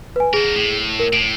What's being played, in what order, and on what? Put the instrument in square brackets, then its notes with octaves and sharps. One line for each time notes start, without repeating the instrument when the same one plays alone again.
[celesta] B4 G#5
[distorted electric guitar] D3 A#4 [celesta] G#4
[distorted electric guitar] A2
[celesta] A#4
[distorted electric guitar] A2 [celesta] D7